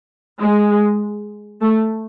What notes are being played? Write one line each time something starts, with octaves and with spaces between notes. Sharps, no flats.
G#3
A3